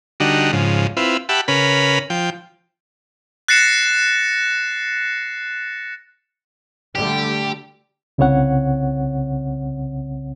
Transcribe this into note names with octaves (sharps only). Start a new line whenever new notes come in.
D3 G3 D#4 F#4
G#2 C#3 F3
C4 E4 F4 B4
G4 E5 F#5 A5 B5
C#3 C#4 A#4 B4 B5
F3 G5
F#6 A6 A#6 C7 C#7 E7
D3 G3 A3 G4
C2 C#3 C4 C#5 F#5